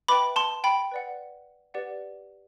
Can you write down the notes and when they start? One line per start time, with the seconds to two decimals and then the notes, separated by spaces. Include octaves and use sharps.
0.08 B4 E5 G5 B5 D6
0.36 A5 C6
0.64 G5 B5
0.92 B4 D5 F#5
1.74 G4 B4 D5 F#5